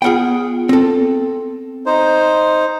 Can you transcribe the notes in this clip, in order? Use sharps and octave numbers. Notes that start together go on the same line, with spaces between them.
B3 F4 G#4 F#5 G5
C4 A4
D#4 C5